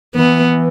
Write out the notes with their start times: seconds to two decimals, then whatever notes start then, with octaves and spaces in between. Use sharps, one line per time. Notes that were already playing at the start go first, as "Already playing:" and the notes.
0.15 E3 B3